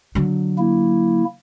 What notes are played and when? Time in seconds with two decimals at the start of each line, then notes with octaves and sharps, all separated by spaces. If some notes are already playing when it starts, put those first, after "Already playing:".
0.15 D3 F#3
0.58 A#3 E4